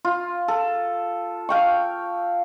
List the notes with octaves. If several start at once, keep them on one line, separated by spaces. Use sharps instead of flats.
F4
A4
F5 G5 C#6